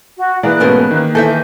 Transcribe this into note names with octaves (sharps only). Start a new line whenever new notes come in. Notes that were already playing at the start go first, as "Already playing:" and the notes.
F#4
E3 A#3 G#4 B4 D5 F#6
G#2 B2 A3 C#4 A#4 C5 D5
D#3 A#3
E3 A4 C5 E5 G#5 G6